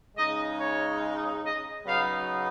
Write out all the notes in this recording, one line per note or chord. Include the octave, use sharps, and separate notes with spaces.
C#3 G#3 D#4 D#5
C#5
D#5
C#3 F#3 B3 D#4 F5